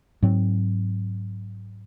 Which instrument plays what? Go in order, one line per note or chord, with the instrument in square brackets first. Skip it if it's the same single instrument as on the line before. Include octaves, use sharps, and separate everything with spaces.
[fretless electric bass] G#2 F#3 C4